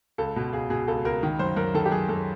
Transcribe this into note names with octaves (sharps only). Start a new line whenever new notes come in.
C#2 A4
B2
C#2 G#4
B2 G#4
C#2 A4
C#2 A#4
D#3
F#2 C5
F#2 A#4
D#3 A4
G4
F#2 G#4
F#2 A4